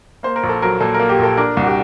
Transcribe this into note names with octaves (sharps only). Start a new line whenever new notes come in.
A#3 C5
A#4
A#1
A4
F#3 A#4
A#2 A4
A#4
A#3
G4
A#1 A4
D4 A#4
C2 F#4
G4